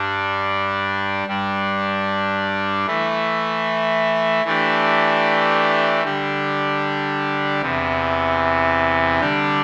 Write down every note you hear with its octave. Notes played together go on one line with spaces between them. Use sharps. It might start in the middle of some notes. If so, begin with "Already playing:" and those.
Already playing: G2 G3 D4
G2 G3 D4
E3 A3 E4
E3 A3 D4 G4
D3 G3 D4 G4
E2 C3 E3
D3 G3 D4 G4